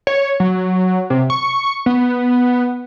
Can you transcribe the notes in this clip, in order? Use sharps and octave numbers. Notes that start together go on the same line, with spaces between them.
C#5
F#3
C3
C#6
B3